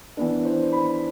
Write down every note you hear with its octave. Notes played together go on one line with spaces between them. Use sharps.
E3 B3 D4
C5
B5